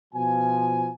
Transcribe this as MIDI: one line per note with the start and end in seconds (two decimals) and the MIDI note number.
0.14 0.89 47
0.14 0.89 53
0.14 0.89 80